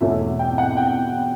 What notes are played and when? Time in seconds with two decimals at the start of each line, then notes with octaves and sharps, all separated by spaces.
0.01 E2 B2 A3 C#4 E5
0.39 G5
0.58 F#5
0.77 G5